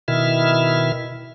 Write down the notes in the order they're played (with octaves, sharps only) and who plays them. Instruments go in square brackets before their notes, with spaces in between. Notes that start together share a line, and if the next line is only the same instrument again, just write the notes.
[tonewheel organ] B2 D#3 E4 E5 F6